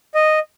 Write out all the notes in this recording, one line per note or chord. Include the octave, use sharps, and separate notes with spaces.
D#5